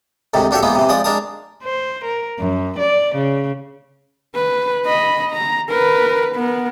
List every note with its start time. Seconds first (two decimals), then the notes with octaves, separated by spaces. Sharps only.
0.34 D2 G#2 C3 D#3
0.51 A#1 D4 F#4 G4 A4 E5
0.63 E3 F3 G#3 A#3 B3
0.75 C3 E3
0.89 F3 G#3 D5 D#6
1.04 G#3 D4 A#4 A5 D#6
1.63 C5
2.04 A#4
2.39 F#2
2.78 D5
3.15 C#3
4.35 B4
4.86 D#5 B5
5.32 A#5
5.69 A#4 B4
6.36 B3 A#4